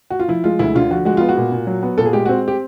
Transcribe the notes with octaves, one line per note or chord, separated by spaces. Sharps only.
F#4
F4
F3 E4
G#3 F4
D2 E4
D3 F4
F3 F#4
G#3 F#4
B3 F4
F#4
A#2
A#2
F#3
B3
A#2 A4
G#4
G#3 G4
C4 F#4
G4